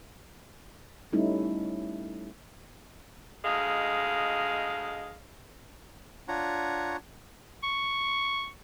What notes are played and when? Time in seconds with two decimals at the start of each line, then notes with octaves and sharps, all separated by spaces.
1.13 G3 A3 C#4 D#4 E4
3.44 D2 G#3 D#5 F5
6.28 D4 F4 C#5 F#5 A#5 C#6
7.63 C#6